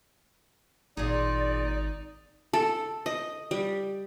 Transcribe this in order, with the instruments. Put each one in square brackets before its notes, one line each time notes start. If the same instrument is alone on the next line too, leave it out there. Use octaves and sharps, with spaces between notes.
[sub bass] G#1 [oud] A#2 G#4 [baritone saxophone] D#4 [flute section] D5
[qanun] A4
D#5
G3